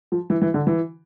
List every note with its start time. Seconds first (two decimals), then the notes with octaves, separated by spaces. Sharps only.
0.12 F3
0.30 E3
0.42 E3
0.54 D3
0.67 E3